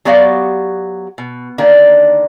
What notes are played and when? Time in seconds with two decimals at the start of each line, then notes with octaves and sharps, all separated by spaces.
0.05 F#3 B3 F#4 G4 D5 F5
1.18 B2
1.58 D3 D#3 A#3 D4